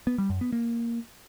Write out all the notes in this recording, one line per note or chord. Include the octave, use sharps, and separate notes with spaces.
B3
G3
F#2
B3
A#3